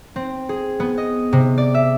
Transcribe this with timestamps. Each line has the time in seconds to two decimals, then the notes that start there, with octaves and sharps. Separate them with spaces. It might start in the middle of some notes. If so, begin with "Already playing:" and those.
0.16 C4
0.49 G#4
0.80 B3
0.98 D#5
1.33 C3
1.58 D5
1.74 E5